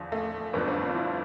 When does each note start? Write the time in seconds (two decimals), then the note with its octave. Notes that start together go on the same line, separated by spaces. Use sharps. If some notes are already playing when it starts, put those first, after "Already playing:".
Already playing: E2 D3 F3
0.12 A3
0.53 G1 F2 D3 F3 B3
0.68 C4
0.82 D4
0.89 F4
0.96 E4